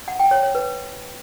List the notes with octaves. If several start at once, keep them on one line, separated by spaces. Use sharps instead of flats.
F#5
G5
C#5
C#5
B4